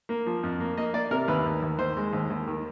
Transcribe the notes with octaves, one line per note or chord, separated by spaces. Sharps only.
A#3
F3
F2
A#3
A#3 D#5
A#3 D5
C3 A#4
D#2 B4
D#2
D#2
D#2 C5
G#3
D#2
D#2
D#3